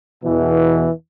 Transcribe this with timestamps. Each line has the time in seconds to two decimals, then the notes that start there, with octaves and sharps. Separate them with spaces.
0.23 E2 B2 E3